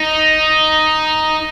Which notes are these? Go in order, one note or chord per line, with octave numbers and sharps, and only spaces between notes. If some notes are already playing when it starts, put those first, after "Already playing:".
Already playing: D#4